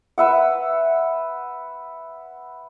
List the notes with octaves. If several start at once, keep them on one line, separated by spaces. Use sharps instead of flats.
B4 E5 F#5